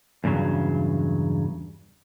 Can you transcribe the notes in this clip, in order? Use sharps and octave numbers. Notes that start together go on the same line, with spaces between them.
E2 G2 C#3 F#3